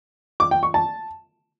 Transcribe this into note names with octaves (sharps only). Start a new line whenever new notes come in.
D6
G5
C#6
A5